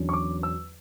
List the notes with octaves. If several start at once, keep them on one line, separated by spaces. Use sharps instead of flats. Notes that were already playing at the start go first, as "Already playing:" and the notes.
Already playing: E2 D3 F#3 C#4
C#6
D6
E6